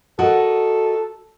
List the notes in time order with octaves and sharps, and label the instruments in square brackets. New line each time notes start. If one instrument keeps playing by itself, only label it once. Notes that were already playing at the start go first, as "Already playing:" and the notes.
[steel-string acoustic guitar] F#4 A#4 D#5 [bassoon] A4